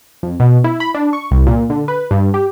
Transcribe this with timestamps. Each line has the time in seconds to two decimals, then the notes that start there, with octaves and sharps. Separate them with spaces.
0.23 F2
0.40 B2
0.64 E4
0.80 B5
0.94 D4
1.13 C#6
1.31 C2
1.47 A#2
1.70 D3
1.88 B4
2.11 G2
2.34 G4